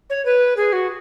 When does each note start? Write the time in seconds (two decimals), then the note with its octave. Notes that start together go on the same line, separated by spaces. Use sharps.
0.10 C#5
0.25 B4
0.57 G#4
0.73 F#4